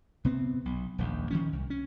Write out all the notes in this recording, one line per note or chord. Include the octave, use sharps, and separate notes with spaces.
C3 B3 C4
B1
D#1 A#1 D#2
D#3 F3 C#4
C2
C#4